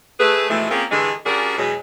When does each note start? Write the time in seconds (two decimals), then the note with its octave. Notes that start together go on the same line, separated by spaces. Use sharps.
0.19 A3 G#4 B4
0.49 B2 E3 F3 G#3 A3
0.70 A#3 C4 C#4 F4 G#4 A#4
0.91 G2 D3 E3 G#3
1.25 G3 C#4 D4 F#4 G#4 A#4
1.57 E2 B2 F#3 G#3